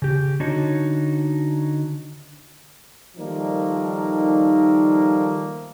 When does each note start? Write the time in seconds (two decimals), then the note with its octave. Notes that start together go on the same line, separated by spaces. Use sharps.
0.02 C#3 G4
0.40 D3 D4 D#4 F#4 C#5
3.17 D#3 F3 G3 A3 A#3 D#4